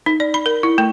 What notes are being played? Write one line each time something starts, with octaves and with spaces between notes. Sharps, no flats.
D#4
D5
B5
A#4
E4
A3